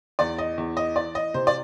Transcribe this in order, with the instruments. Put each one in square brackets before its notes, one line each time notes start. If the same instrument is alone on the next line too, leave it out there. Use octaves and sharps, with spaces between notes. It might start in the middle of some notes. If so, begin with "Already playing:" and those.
[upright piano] E2 D5
D#5
E2
D#5
E3 D5
D#5
C3 C5
D5